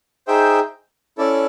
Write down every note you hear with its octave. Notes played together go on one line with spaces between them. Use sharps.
D#4 G#4 C5 E5 G5
C#4 E4 A4 D5